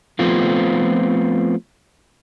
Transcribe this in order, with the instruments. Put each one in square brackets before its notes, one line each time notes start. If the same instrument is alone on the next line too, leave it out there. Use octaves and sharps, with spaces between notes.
[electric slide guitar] F3 A3 B3 C4 F4